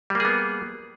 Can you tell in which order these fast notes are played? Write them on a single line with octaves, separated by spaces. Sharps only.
G3 A#3 G#4 B3